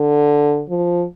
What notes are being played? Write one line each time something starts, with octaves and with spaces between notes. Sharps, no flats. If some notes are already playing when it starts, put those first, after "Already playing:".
Already playing: D3
F3